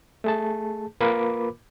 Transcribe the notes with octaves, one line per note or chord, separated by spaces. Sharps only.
A3 G#4 A5
A#3 F4 A#4 B4 B5 D6